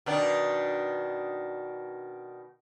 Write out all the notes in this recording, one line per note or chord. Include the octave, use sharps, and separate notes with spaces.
B2 D#3 D4